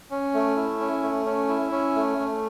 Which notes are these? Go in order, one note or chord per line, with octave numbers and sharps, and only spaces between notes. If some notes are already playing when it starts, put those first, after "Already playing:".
C#4
A3
E4
C#4
A3
C#4
E4
C#4
A3
A3